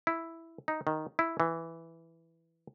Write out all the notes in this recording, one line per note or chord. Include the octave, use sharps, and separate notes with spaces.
E4
D#4
D#3
E4
E3